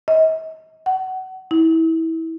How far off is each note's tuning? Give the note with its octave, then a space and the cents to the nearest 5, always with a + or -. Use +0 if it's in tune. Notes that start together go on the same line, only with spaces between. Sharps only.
D#5 +40
F#5 +25
E4 -25